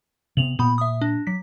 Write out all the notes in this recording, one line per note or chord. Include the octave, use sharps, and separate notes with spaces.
C3 B3 F7 F#7
A#2 B3 B5
E5 D#6
D4
F#3 B6